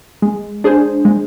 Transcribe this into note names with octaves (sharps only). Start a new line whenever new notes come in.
G#3
D4 G#4 C5
G#3